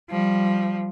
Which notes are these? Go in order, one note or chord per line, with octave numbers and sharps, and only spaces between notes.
F3 G3